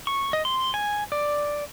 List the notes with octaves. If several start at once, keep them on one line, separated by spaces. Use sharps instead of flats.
C#6
D#5
C6
G#5
D5